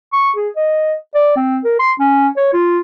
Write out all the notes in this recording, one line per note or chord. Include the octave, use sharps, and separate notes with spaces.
C#6
G#4
D#5
D5
C4
A#4
C6
C#4
C#5
F4